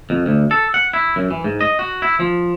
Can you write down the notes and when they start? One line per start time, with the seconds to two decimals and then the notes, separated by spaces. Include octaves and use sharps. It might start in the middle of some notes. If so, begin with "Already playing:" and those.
0.10 F2
0.26 D2
0.51 A4
0.74 F#5
0.93 E4
1.16 F#2
1.31 E3
1.44 G#2
1.61 D#5
1.79 F#4
2.02 E4
2.20 F3